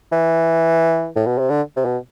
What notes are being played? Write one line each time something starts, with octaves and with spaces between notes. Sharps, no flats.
E3
A2
B2
C3
D3
C3
B2